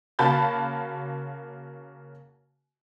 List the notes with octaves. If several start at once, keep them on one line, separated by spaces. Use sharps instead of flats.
C#3 A#3 F#4 A5 B5 G6